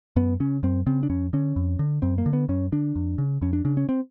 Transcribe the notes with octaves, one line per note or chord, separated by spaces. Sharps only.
F#2 B3
C#3 C#4
F#2 C4
C#3 C4
D4
F2 C#4
D3 C#4
F2
D3
F#2 C4
A#3
D3
B3
F#2 C#4
D3 D4
F2
C#3
F2 C#4
D4
C#3 D4
C#4
C4